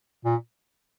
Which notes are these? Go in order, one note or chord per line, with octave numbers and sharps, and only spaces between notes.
A#2